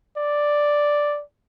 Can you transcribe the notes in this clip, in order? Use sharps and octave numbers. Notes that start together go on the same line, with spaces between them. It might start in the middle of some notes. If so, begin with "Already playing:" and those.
D5